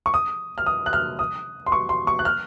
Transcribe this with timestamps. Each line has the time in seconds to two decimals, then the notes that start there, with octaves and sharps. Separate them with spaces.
0.06 C#6
0.14 D#6
0.58 F6
0.66 D#6
0.86 F#6
0.93 F6
1.19 D#6
1.66 C6
1.72 C#6
1.89 C6
2.07 C#6
2.19 F#6
2.25 F6